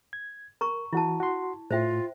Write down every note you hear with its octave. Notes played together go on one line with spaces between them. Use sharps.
G#6
A#4 A#5 C#6
E3 E4 F#4 A5
F#4 C6
A2 F4 C5 E5 G5